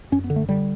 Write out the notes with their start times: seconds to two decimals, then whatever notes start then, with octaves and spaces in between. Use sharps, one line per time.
0.12 F#2 C#4
0.24 B3
0.30 D3
0.36 A3
0.49 D3 G3